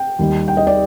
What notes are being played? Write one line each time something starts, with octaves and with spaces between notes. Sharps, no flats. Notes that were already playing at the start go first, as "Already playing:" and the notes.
Already playing: G5
D#2 D#3 G3
G5
D#5
D5